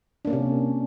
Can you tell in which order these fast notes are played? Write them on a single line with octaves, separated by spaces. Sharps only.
D4 A#3 C#4 C3